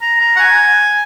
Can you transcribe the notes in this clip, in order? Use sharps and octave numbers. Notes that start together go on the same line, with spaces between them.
A#5
A#5
F#5
G#5